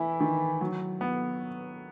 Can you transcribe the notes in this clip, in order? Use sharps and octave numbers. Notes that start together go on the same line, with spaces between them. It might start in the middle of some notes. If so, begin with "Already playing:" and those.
Already playing: E3 E4
D#3
F#3
B3